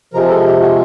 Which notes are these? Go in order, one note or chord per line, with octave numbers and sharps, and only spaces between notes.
C3 F3 G#3 A#4
A4
G4
F#4